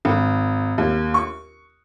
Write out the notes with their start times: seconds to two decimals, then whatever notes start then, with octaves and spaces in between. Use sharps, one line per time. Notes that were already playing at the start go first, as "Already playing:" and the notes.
0.05 G#1
0.78 D#2
1.14 C#6